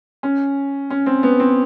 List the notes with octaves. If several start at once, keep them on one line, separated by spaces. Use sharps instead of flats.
C#4
C#4
C4
B3
C4